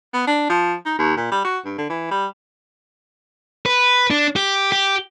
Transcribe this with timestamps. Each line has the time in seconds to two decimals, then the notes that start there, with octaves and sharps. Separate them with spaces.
0.14 B3
0.27 D4
0.49 F3
0.85 D#4
0.98 D#2
1.17 A#2
1.32 G3
1.45 F#4
1.65 G2
1.78 D3
1.90 E3
2.11 G3
3.66 B4
4.10 D4
4.36 G4
4.72 G4